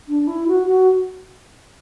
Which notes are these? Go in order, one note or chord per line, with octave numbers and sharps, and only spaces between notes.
D4
E4
F#4
F#4